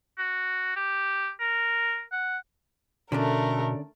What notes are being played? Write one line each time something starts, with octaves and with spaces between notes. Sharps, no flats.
F#4
G4
A#4
F#5
B2 D3 A3 C#4 D4 A#4